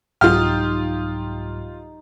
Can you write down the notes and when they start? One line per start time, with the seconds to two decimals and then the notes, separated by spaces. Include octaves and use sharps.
0.21 C2 G#2 F#3 D#4 F4 G4 F6